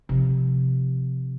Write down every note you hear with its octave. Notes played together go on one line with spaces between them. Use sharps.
C3 F3